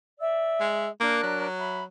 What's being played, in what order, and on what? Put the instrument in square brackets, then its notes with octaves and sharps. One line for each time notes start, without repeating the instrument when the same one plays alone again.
[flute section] D5 E5 E6
[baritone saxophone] G#3
[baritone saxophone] A#3 [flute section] D4 A#4 F#6
[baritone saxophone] F#3
[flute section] E5 B5